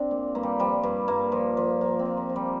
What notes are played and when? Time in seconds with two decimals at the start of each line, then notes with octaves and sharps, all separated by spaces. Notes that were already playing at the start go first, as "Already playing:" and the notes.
Already playing: C4 D4
0.11 A#2
0.35 G2 A#3
0.43 G3
0.59 F3 G3
0.83 G2
1.08 G2 A#3
1.32 F3
1.57 F3
1.81 F3 A#3
1.99 C4
2.05 F3
2.17 A#3
2.29 F3
2.36 G3